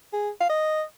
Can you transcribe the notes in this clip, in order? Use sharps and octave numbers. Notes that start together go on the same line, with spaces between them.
G#4
F5
D#5